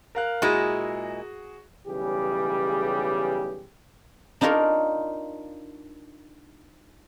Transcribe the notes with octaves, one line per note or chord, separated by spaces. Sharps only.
A#4 F5 F#6
A#2 G#3 E4 F#4 G#4
B1 C#3 E3 G3 G4 G#4
D4 D#4 F4 A#4 C#5